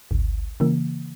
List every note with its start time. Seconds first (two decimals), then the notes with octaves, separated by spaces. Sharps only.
0.11 G#1 D2
0.60 C#3 E3 A#3